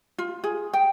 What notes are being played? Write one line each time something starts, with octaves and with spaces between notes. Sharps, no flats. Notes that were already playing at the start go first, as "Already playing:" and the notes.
F4
G#4
G5